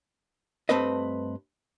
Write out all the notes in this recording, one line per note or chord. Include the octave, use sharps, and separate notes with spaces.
G2 B2 A3 C4 B4 D#5